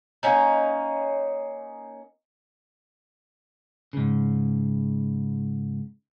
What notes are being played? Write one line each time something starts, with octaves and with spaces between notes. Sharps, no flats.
A#3 C#4 D#4
G#2 C#3